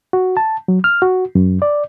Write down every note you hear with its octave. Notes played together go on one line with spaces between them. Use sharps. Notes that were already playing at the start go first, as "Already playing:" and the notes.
F#4
A5
F#3
F6
F#4
F#2
D5